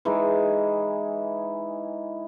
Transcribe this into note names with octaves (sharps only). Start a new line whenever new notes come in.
E3 G#3 D#4